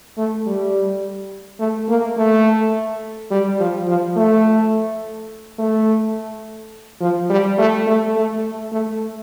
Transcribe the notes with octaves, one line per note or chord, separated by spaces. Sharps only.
A3
G3
A3
A#3
A3
G3
F3
F3
A3
A3
F3
G3
A3
A3
A3
A3